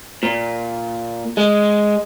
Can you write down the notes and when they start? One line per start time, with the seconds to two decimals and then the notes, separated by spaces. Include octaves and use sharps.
0.23 A#2
1.37 G#3